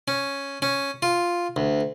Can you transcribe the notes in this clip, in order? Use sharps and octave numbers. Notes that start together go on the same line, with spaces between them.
C#4
C#4
F4
D2